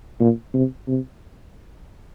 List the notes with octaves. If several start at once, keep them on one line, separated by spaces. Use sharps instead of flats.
A#2
C3
C3